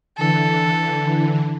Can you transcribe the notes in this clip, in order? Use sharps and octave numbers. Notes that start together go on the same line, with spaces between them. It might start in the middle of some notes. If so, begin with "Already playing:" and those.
D3 E3 A4